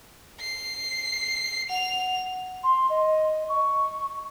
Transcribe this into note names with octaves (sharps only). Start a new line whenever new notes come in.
C7
F#5 F7
C6
D#5
C#6